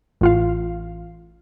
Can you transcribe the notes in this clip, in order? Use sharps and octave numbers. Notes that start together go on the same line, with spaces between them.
A1 F4 F5